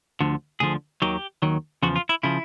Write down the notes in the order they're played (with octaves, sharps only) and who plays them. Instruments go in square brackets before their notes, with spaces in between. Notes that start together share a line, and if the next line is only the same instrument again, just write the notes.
[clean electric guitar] D2 D3 F3
D2 D3 F3 G#4
D#2 D#3 F#3 G4
D#2 D#3 F#3
E2 C#3 F3 F#4
F4
E4
C#3 F3 E4